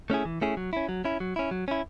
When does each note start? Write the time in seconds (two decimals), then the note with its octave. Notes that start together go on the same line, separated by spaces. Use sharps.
0.10 A3 C#4 E4 G#4
0.25 E3
0.41 A3 C#4 E4 G#4
0.57 F#3
0.73 C#4 E4
0.89 F#3
1.04 C#4 E4
1.20 F#3
1.36 C#4 E4
1.51 F#3
1.68 C#4 E4